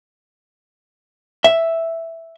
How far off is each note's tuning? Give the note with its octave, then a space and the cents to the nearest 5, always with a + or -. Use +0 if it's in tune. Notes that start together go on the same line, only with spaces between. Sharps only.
E5 +0